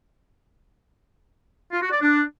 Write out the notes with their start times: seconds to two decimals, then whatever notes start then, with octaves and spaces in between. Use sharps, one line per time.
1.72 F4
1.82 F#4
1.92 D5
2.01 D4